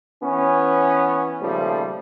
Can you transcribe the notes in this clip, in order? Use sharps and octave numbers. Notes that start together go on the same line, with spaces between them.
E3 B3 C#4
D#2 C#3 F3 G3 A3